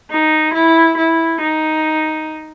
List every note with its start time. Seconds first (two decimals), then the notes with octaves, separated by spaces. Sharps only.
0.11 D#4
0.54 E4
0.97 E4
1.41 D#4